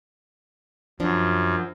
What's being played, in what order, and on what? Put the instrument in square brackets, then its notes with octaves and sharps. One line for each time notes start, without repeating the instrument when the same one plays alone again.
[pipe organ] F#2 [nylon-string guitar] F3 D4